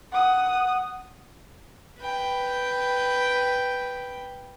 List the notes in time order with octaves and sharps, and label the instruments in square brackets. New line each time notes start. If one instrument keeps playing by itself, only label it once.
[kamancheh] F#5 D#6
[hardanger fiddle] B4 G5